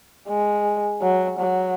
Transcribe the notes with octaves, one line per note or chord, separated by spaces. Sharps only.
G#3
F#3
F#3